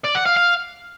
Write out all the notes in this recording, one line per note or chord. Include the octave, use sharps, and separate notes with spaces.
D5
F#5
F5
F5